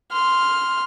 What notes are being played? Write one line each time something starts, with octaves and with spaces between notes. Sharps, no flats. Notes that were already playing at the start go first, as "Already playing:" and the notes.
C6 F6